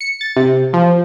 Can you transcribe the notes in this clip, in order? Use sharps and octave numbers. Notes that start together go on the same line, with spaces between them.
C#7
A6
C3
F3